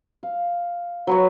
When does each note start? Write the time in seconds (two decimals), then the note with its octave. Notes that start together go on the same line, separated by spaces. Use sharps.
0.23 F5
1.07 F#3 B4 C#5